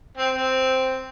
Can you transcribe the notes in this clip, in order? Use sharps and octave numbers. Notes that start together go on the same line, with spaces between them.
C4
C4